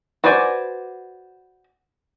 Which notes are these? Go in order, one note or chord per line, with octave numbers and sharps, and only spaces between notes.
F#4 B4 C5 D5 G#5